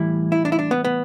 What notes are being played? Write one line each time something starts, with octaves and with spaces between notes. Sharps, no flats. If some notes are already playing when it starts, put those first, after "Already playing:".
Already playing: A2 E3 G3 E4
E4
D4
E4
D4
B3
B3